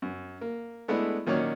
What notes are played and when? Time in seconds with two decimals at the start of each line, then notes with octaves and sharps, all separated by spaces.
0.02 F#2
0.41 A#3
0.88 G#3 A3 B3 D4 E4
1.26 A#2 D#3 F#3 C#4 C#5 D5